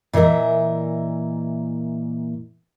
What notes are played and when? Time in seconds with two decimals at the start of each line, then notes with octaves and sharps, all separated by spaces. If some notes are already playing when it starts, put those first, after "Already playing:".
0.13 A#2 E3 A#4 D#5 E5